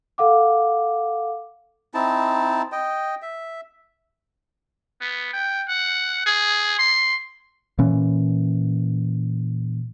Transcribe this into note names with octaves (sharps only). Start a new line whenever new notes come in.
A4 F5 F#5 D6
C4 D#4 E4 A5
D#5 G5
E5
B3
G5
F#5
G#4
C6
A#2 E3 C#4